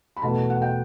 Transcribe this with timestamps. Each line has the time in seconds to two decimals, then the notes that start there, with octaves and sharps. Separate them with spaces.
0.17 B5
0.22 E2 B2 A3 A5
0.50 F#5
0.62 G5